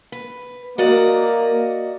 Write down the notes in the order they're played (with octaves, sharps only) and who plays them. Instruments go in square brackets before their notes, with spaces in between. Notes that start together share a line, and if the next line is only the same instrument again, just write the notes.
[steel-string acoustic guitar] B4
[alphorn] A#3 [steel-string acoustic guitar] F#4 D5 D#5